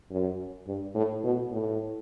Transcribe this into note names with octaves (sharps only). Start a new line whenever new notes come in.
F#2
G2
A2
B2
A2